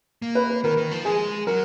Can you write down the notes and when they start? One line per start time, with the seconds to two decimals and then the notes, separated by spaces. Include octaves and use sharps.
0.22 A#3
0.35 B4
0.50 B4
0.64 D#3 A#4
0.77 D#3
0.91 F3
1.05 G#3 G#4
1.47 F#3 A#4